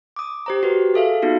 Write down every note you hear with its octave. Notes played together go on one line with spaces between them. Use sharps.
D6 D#6
G4 C5 A#5
F#4 G4 B4
G#4 A4 E5 F5
B3 D#4 F4 F#4